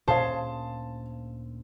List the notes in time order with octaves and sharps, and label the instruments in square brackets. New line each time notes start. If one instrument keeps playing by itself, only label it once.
[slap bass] D2 A#2 C#4 [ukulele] G#4 C#5 F5 [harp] C5 [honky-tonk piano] A5